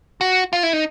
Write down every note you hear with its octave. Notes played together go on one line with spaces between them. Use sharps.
F#4
F4
E4
D#4